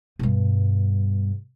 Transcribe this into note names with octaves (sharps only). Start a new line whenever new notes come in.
G2 B2